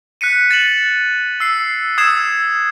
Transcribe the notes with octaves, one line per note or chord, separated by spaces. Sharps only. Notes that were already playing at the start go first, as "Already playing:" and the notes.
F#6 B6 C#7 D#7
A6 E7 F#7
E6 C7
D#6 E6 G#6 C7 E7